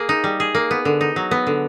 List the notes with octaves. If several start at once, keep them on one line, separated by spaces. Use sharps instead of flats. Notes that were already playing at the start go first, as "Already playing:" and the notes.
Already playing: A#3 G#4
D#4
G3
G#4
A#3
B3
D3
D#4
F#3
B3
D3